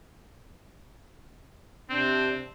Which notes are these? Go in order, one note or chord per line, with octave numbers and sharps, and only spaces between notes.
C3 C4 D4